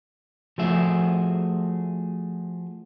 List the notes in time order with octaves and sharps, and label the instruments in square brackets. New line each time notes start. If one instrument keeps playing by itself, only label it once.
[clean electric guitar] F3 A3 F#4 G#4 E5